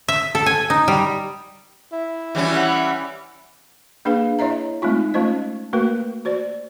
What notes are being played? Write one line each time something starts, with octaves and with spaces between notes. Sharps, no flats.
E5
A4
G#5
D#4
G3
E4
E2 B2 E3 G3 C#4
C#5 E5 F#5
A#3 D4 G#4 B4 F5
E4 C#5 D#5 E5 A#5
G#3 A3 C4 D#4 F4
A3 C#4 F4 C5 D#5
A3 A#3 F#4 A#4 B4
F#4 C5 D5